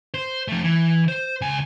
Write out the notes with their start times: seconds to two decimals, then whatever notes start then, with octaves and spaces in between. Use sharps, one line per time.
0.14 C5
0.48 F3 A3
0.64 E3
1.08 C5
1.41 C#2 G#5